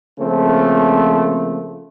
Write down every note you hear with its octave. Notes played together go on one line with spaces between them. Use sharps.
C#3 F3 A3 A#3 C4